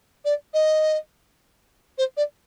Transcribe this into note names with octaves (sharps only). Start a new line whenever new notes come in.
D5
D#5
C5
D5